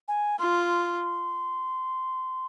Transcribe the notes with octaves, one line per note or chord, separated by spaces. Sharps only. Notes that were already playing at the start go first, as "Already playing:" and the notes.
G#5
F4 C6